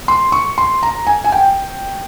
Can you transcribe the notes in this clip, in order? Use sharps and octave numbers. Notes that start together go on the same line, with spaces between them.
C6
C#6
C6
A#5
G#5
G#5
G5